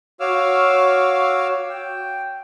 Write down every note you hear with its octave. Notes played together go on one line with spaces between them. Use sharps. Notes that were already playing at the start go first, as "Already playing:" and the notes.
F#4 C#5 F5 D6 E6 F6
G5